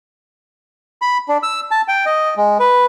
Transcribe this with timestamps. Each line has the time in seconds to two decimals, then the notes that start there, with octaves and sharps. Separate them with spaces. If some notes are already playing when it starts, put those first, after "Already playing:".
1.02 B5
1.28 D4
1.43 E6
1.71 A5
1.88 G5
2.06 D#5
2.37 G#3
2.60 B4